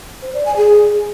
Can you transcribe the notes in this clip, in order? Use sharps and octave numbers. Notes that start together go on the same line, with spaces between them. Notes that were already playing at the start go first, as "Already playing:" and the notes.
C5
D5
G#5
G#4